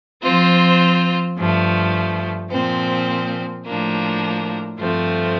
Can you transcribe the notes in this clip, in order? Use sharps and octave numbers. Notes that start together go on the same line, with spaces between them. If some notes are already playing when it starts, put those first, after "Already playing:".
F3 C4 F4 C5
G2 F3 A3
A#2 F3 C4
A2 F3 A#3 D4
G2 F3 A3 C4